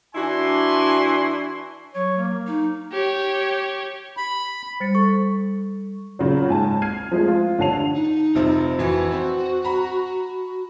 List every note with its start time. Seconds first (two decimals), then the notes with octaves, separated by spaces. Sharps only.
0.15 E3 D4 E4 F#4 G#5 C6
1.95 F#3 C#5
2.18 A#3
2.47 D#4
2.92 G4 C#5
4.17 B5
4.80 G3 C5 A6 C#7
4.95 A4 C#6
6.19 A#2 C#3 F#3
6.48 G#2 G#5 A5
6.82 F6 G#6 C7 D#7
7.11 F3 G#3 A3
7.28 F4
7.59 A1 D3 C#5 A5 C7 F7
7.93 D#4
8.35 F1 C3 F3
8.79 F2 E3 F#4
9.12 C4
9.65 A#5 B5